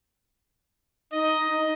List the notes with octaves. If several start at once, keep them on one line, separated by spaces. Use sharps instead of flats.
D#4 D#5